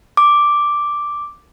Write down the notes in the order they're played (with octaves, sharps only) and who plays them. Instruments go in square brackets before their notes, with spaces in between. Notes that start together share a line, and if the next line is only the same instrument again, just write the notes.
[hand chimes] D6